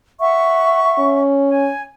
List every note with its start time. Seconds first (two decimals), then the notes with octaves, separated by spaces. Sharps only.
0.19 E5 F#5 C#6
0.98 C#4
1.50 G#5